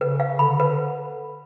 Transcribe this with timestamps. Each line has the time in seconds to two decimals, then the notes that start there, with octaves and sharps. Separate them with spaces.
0.01 C#3 B4
0.20 F5
0.39 D3 B5
0.60 B4